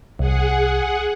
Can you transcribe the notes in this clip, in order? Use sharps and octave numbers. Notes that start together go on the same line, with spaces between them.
C2 G#4 F#5